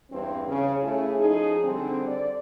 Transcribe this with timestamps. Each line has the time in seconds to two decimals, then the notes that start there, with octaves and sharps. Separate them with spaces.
0.11 E2 G2 C4
0.48 C#3
0.83 A3 C#4 E4 G#4
1.19 F3 D#4 G#4
1.64 D3 G3 C4
2.06 D5